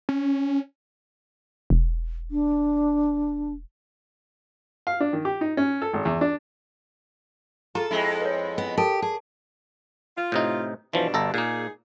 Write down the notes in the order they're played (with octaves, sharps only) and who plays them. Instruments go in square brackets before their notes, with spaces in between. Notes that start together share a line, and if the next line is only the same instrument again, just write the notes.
[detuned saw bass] C#4
[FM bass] E1
[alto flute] D4
[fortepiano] F5
D4
D#3
G4
D#4
C#4
A4
G#1
E2
D4
[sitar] F4 [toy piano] G#4 A#5 [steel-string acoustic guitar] A4
[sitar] F2 G#3 E4
[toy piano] B4 C#5
[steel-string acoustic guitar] B3
[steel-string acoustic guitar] G4 [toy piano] A4 A#4 A5
[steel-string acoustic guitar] G#4 [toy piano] A5
[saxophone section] F4
[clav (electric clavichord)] A2 C3 D#4
[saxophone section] G2 B2 D4 [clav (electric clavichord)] E3 F3
[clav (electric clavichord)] G1 A4 A#5
[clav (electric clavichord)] A#2 A#3 [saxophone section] D#4 G#4